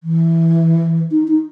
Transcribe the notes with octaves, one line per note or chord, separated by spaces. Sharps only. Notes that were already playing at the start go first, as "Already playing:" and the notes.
E3
D#4
D#4